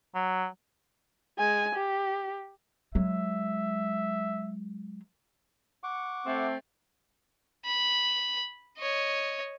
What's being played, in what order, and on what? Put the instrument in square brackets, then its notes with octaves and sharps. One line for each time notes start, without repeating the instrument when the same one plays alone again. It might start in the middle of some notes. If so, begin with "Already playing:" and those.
[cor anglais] F#3
[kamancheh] G#3 G#5
G4
[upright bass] F#3 G#3 [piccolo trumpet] E5
[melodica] F#5 C#6 D6
[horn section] A3 C4
[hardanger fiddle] B5
C#5 D#5